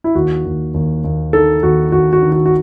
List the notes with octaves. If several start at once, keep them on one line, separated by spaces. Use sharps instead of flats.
E4
D#2 F#4
D#2
D#2
D#2
D#3 A4
D#2 F#4
D#2 F#4
F#4
D#3
F#4
F#4